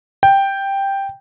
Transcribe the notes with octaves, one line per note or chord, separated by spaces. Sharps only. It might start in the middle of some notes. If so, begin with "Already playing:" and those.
G5